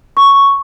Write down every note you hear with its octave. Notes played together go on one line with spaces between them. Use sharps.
C#6